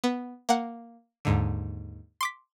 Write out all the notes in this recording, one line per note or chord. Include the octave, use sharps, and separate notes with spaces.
B3
A#3 F#5
D#2 G#2 D3
C6 D6 B6